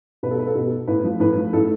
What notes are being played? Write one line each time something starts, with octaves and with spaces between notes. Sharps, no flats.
B2 B4
A4
B4
A4
B2
A2 B4
F3
A2 B4
F3
A2 A4